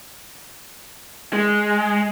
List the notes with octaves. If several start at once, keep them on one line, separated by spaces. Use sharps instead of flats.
G#3